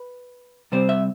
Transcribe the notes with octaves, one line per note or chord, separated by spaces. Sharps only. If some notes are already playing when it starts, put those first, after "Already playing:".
Already playing: B4
C3 G3 C4 C5
E5